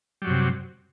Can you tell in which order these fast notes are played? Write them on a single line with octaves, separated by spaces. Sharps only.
G3 F#3 F#2 C3